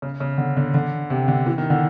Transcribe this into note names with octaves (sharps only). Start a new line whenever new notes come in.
C#3
C#3
D3
D3
D3
C3
D3
E3
D#3
D3